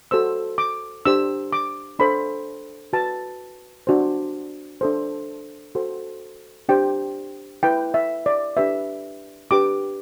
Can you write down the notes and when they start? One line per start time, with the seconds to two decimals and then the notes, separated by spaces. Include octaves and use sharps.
0.11 F#4 A4 C5 E6
0.58 D6
1.05 D4 G4 C5 E6
1.53 D6
1.99 D4 A4 C5 B5
2.93 F#4 B4 A5
3.87 D4 F#4 C5
4.81 D4 A4 C5
5.75 F#4 A4 C5
6.69 D4 G4 C5 G5
7.63 E4 B4 G5
7.94 E5
8.26 D5
8.57 D4 G4 B4 E5
9.51 D4 G4 B4 D6